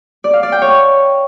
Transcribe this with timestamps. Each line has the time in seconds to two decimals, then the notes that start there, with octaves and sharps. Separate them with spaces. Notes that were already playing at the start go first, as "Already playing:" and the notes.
0.24 D5
0.34 F5
0.43 D5
0.52 G5
0.62 C#5